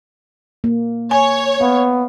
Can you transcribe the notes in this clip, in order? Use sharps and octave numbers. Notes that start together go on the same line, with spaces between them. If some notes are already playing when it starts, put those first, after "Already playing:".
A#3
C#5 G#5
B3 F5